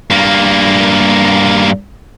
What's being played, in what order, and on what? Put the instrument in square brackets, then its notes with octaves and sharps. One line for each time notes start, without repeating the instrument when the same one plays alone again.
[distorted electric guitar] G2 A#3